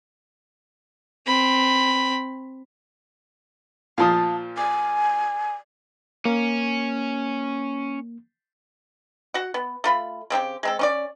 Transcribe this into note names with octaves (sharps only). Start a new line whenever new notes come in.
C4 B5
A#2 F3 F5 A5 D#6
D5 G#5
A#3 C#4
F#4 F#5
B3
A3 F4 B5
C#3 C4 D4 G4
G#3 C4 A4
C#4 F#4 D5